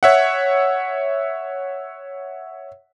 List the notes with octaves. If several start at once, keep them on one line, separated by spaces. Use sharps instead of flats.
C#5 E5 F#5